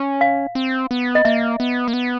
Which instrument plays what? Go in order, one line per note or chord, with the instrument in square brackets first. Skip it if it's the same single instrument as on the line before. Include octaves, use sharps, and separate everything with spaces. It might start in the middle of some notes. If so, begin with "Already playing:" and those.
Already playing: [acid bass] C#4
[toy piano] F5
[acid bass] C4
B3
[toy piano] D#5
[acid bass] A#3 [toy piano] E5
[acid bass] B3
A#3
B3